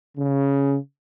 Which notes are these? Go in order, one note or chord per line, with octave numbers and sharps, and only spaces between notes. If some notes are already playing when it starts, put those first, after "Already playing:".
C#3